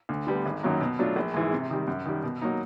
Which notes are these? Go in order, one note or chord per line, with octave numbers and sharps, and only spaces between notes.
D2
D3 G3 B3
G#1
F#2 D#3 F#3 A#3
B2
F#3 A3 D4 F4
A#1
G#2 E3 G#3
C3
D#3 G3
F#2
D#3 G3
B2
F#3 A#3 D#4